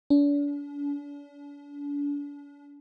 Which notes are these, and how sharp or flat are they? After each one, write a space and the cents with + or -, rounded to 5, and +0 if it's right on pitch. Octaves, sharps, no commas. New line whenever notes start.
D4 -40